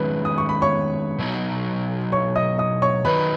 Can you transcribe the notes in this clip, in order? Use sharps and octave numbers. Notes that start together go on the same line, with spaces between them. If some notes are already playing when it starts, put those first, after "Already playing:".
Already playing: D#3 G#3 C#4 B4 B5
D#6
C#6
B5
C#5 C#6
B2 F#3 B3 D#4
C#5 C#6
D#5 D#6
D#5 D#6
C#5 C#6
D#3 F#3 D#4 B4 B5